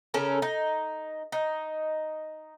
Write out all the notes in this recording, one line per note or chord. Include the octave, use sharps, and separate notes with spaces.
C#3 C#4 A4 A#4
D#4
D#4